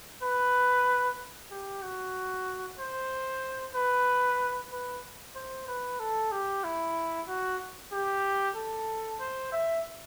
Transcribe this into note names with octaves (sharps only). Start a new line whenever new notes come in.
B4
G4
F#4
C5
B4
B4
C5
B4
A4
G4
E4
F#4
G4
A4
C5
E5